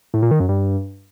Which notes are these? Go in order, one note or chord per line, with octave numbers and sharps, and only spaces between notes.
A2
A#2
D#3
F#2
G2